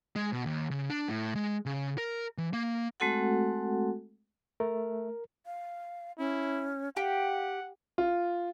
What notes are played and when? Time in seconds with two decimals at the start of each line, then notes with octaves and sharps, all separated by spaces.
0.16 G#3
0.33 B2
0.46 D#2
0.71 C#3
0.90 D4
1.09 A2
1.35 G#3
1.66 C#3
1.98 A#4
2.38 E3
2.53 A#3
3.00 G#3 A3 C4 F#4 A4 F#5
4.60 A3 A#4
5.46 F5
6.18 C#4 E4
6.97 G4 F5 F#5
7.98 F4